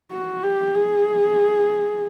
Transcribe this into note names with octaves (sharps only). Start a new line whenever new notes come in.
F#4
G4
G#4